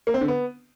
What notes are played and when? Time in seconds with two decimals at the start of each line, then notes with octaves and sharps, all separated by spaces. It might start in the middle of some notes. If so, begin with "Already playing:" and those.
0.07 A#3
0.14 C4
0.21 D3
0.28 B3